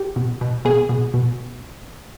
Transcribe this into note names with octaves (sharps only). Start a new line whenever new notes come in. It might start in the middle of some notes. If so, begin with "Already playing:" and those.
Already playing: G4
B2
B2
B2 G#4
B2
B2